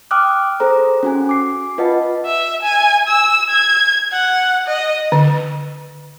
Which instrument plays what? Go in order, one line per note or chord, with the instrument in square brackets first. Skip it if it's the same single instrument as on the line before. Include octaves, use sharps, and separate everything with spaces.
[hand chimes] G5 D6 D#6 F6 F#6
G#4 A4 C5 A#5
C#4 F#4 G#5
D6 C7
F4 B4 D#5 F#5 A5
[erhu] E5
G#5
E6
G#6
F#5
D#5
[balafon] D3